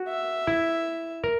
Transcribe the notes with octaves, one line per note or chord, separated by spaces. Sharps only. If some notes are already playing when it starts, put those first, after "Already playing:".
Already playing: F#4
E5
E4
A#4